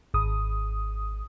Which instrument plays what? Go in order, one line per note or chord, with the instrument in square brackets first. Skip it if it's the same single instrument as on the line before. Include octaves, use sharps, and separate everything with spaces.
[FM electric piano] G#1 D#6